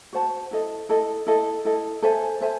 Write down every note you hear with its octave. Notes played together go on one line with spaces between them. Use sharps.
F#4 C5 F#5 A5
E4 A4 D#5
E4 A4 D#5
E4 A4 D#5
E4 A4 D#5
A4 C5 E5 G#5
A4 C5 E5 G#5